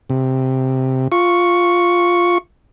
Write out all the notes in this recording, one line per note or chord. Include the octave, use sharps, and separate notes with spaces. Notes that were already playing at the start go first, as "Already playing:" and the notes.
C3
F4 C#6